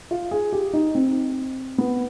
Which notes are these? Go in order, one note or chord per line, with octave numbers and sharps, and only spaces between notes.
F4
G#4
G4
D#4
C4
B3